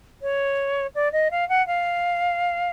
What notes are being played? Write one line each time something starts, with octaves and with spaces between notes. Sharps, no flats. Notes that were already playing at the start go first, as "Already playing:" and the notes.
C#5
D5
D#5
F5
F#5
F5